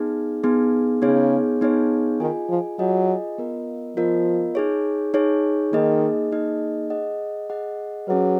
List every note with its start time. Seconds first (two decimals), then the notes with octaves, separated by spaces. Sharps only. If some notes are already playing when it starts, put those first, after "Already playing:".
Already playing: B3 D#4 G#4
0.44 B3 D#4 G#4
1.02 C#3 B3 D#4 G#4 C#5
1.61 B3 D#4 G#4 C#5
2.20 D#3 F4 G#4 D#5 G#5
2.49 F3
2.79 F#3 F4 G#4 D#5 G#5
3.38 B3 F4 A#4 D#5
3.96 F3 B3 F4 A#4 D#5
4.55 D#4 G#4 C#5
5.14 D#4 G#4 C#5
5.73 D#3 A#3 D#4 G#4 D#5
6.31 A#3 D#4 G#4 D#5
6.90 G#4 D#5 F#5
7.50 G#4 D#5 F#5
8.08 F#3 C#4 G#4 B4